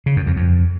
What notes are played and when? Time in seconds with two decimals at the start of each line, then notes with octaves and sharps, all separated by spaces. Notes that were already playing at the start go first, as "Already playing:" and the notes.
0.06 C#3
0.16 F#2
0.26 F2
0.36 F2